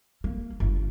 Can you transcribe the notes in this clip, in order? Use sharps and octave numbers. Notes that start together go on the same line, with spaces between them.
A#3
G1